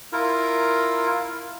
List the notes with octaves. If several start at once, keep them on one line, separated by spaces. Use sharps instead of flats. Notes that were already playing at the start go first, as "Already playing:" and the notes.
E4 F4 A#4